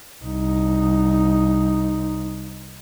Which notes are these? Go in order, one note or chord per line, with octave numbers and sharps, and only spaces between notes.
C2 D#4